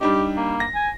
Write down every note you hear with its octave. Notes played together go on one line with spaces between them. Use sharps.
G3 D4 D#4 G4
A#3
A#6
G#5